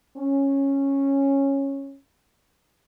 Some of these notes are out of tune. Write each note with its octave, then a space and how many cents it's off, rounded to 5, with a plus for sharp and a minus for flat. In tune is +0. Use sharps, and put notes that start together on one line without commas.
C#4 -10